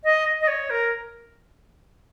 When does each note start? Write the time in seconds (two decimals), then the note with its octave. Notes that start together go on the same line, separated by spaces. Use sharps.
0.04 D#5
0.41 D#5
0.48 C#5
0.70 A#4